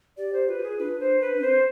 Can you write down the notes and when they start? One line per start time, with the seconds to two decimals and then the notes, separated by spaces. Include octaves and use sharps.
0.17 G4 D5
0.33 C5
0.48 F4 B4
0.63 G#4
0.79 D4 B4
1.00 C5
1.21 B4
1.37 D4
1.41 C4 C5